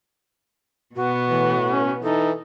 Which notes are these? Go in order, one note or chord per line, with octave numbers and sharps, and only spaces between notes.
B2 B3 F#4
A2 E3
C#4
E3 D#4 A4